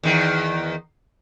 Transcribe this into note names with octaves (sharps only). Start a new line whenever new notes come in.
E2 D#3